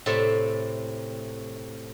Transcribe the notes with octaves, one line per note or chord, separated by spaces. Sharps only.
A2 C3 C4 A4 D5 E5